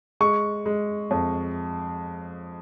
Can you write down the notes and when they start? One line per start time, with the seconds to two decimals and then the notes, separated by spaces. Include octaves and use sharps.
0.20 G#3 C#6
0.66 G#3
1.11 F2